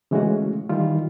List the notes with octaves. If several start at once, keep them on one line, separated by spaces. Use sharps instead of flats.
C#3 E3 G#3 A3 C#4 F#4
D#3 E3 G3 F4